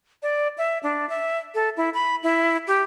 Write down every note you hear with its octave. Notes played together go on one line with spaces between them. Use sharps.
D5
E5
D4
E5
A4
E4
B5
E4
G4